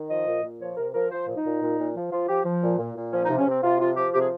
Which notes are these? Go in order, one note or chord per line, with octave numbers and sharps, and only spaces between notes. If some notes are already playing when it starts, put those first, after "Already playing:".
Already playing: D#3
F3 D#5
A#2
A#2
F3 C#5
C3 A#4
F3 A#4
F3 C5
A#2
D#4
A#2
A#2
A#2
F3
F3 F4
F3 G4
F3
A#2
A#2
A#2
F3 C#4
D#4
C3
C#4
C3 C4
C3 F4
F3 F4
F3 G4
C3 G4
G#4